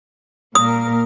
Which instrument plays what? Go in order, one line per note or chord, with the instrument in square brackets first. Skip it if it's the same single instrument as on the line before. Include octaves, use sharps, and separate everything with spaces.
[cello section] A#2 A#4 [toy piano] D#6